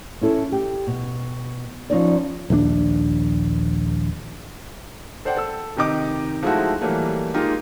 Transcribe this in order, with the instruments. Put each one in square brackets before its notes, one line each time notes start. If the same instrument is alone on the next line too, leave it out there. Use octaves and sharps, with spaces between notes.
[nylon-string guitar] C#4 E4 A4
G4
B2
F3 C#4 D#4 D5
[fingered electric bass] A#1 D#2 D#3 D4
[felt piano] A4 C5 D5 F#5 G5
A4 E6
C3 D#3 D#4 G4 D#5 D6
F3 G#3 A3 D#4 E4 F#4
E3 F#3 G3 A3 A#3
G#3 A#3 D#4 F4 G4